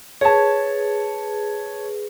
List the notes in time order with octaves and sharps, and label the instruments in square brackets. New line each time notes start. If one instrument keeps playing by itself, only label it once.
[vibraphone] G#4 B4 [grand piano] C#5 A5